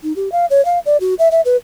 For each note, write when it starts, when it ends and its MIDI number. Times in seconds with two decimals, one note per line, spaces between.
0.03 0.15 63
0.16 0.31 67
0.32 0.46 77
0.50 0.64 73
0.65 0.79 77
0.86 0.97 74
1.01 1.14 66
1.19 1.29 76
1.31 1.41 76
1.45 1.56 71